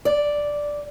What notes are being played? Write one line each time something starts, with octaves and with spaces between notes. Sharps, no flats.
D5